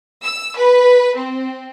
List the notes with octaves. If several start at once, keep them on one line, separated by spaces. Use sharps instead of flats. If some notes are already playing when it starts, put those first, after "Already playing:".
E6
B4
C4